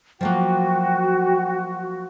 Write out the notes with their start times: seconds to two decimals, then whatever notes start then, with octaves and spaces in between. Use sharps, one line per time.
0.21 F3 F#3 A#3 F#4 G5